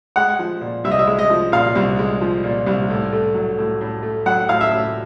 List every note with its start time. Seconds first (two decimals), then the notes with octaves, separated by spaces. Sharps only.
0.16 G#3 F#5
0.39 F3
0.61 A#2
0.84 C2 E5
0.91 D#5
0.99 E5
1.07 G#3
1.19 D#5
1.30 F3
1.52 A#2 F5
1.75 C2
1.99 G#3
2.21 F3
2.44 A#2
2.66 C2
2.90 A2
3.13 A3
3.34 F#3
3.58 A2
3.81 A2
4.03 A3
4.26 F#3 F#5
4.49 A2 F5
4.61 E5
4.71 A2